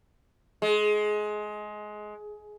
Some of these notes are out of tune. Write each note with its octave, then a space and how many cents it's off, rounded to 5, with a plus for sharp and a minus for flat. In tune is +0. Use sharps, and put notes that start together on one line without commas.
G#3 +20